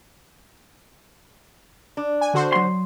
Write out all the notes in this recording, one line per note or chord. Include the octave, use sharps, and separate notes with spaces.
D4
G#5
D3 F#4 C5
F#3 C6